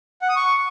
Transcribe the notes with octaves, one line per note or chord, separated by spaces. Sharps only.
F#5
D#6
C#6